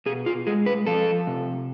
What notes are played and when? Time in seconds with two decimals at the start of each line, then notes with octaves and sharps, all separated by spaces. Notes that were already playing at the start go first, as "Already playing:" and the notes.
0.06 B2 G#4
0.26 F4
0.47 G#3 G#4
0.66 B4
0.87 F3 A4
1.27 C3